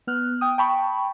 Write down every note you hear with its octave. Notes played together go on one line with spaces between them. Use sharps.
B3 F6 F#6
G5 D#6
G5 A5 B5 C#6